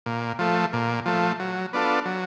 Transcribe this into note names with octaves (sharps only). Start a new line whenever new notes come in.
A#2
F3 A3
A#2
F3 A3
F#3
B3 D4 F4 A4
F#3